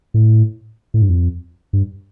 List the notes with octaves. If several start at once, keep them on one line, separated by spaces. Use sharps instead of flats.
A2
A2
G2
F2
G2